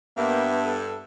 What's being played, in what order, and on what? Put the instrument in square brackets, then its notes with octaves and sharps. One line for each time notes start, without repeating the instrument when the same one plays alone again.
[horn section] G2 [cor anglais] A#3 [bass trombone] B3 [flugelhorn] E5
[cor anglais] A4